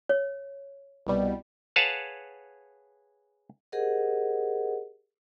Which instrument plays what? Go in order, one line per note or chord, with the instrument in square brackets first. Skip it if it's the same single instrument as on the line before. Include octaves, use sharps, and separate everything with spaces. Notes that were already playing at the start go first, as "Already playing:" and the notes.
[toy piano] C#5
[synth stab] C2 B2 G3
[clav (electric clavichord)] G#4 B4 C#5 F5 F#5 A5
[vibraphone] G4 G#4 A#4 C5 D#5 F#5